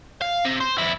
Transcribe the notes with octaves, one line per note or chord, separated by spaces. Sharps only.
F5
C3
C5
F2 E4